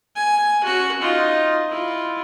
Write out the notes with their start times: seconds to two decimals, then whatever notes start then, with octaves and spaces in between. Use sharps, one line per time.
0.16 G#5
0.64 C#4 F#4
1.00 D#4 F4
1.69 E4 F4